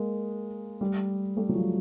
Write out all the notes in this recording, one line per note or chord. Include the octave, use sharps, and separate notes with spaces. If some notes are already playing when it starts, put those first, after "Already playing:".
Already playing: G#3 A#3
G3 A3
G3 A3
F#3
F3 G3